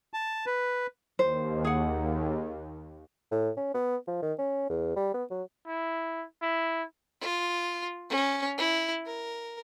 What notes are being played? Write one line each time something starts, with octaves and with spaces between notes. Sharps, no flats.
A5
B4
D#2 C5
G#4 F#5
A2
C#4
B3
F3
D#3
C#4
E2
G3
B3
F#3
E4
E4
F4
C#4
E4
A#4